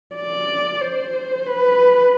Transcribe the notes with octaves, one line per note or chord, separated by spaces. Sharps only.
D5
C5
B4